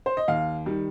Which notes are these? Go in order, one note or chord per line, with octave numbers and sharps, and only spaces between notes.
C5
D#5
D#2 F5
D#3 G3